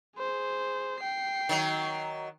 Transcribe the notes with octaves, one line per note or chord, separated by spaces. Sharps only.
G#4 C5
G5 C7
D#3 F#3